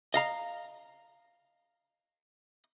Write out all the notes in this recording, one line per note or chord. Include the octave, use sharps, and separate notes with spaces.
D#5 F5 A#5